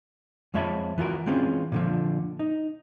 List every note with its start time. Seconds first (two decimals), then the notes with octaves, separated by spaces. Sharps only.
0.54 F2 G#3 C#5 E5 A5 B5
0.98 E3 F4 F#4 A#4
1.26 E3 G#3 C4 C#4 F4
1.72 A#2 D3 F3
2.39 D#4